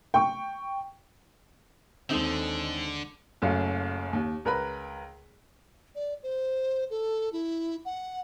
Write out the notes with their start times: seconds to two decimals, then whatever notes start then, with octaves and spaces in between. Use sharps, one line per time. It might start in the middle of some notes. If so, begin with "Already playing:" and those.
0.14 G5 C#6
2.10 D#2 D3 G#3 C4 D#4 A4
3.42 F#1 F#2 A3 F5
4.13 D#2
4.45 C#2 A#4 B4 B5
5.95 D5
6.23 C5
6.90 A4
7.33 E4
7.85 F#5